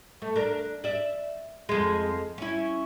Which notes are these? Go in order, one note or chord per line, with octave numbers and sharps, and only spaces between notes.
A3
D4 A#4
D5 E5
F2 G#3
C#4 E4